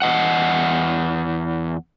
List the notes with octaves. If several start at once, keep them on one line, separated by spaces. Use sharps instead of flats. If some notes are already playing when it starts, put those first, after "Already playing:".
E2 D#5 F#5